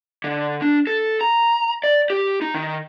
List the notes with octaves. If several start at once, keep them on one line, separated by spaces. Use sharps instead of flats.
D3
D4
A4
A#5
D5
G4
D#4
D#3